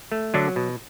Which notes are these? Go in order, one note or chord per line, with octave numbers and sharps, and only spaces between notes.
A3
D3 F#3 D4
B2